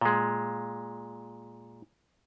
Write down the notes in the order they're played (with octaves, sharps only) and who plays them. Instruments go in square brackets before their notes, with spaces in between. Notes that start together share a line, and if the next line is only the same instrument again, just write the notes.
[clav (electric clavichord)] A#2 G#3